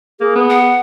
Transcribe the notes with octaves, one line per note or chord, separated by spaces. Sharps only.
A#3 G#4
B3
F#5